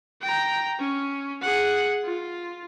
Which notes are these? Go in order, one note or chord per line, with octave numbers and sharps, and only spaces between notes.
G5 A#5
C#4
G#4 F#5
F4